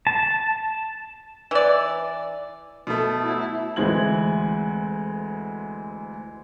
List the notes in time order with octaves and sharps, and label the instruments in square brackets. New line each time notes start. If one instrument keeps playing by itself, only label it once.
[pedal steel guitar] A5
[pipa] E3 D5
[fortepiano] B2 A3
[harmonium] F#3 E4
E4
[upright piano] D2 E3 G#3 C4 G#6 F#7